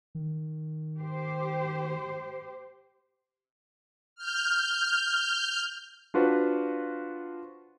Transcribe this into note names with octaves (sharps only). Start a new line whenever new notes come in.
D#3
G4 C5
F6 G6
D4 F4 F#4 B4 C5